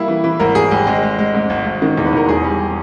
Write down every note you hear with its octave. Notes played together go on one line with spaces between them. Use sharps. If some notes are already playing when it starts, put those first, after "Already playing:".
Already playing: G3 A#3 E4
E3
E3
G#1 A#4
G#1 G#4
G#1 G4
G#3
G#3
G#3
G#2
G#1
G#1
D#3
E2
B4
E2 A#4
E1 G#4
G3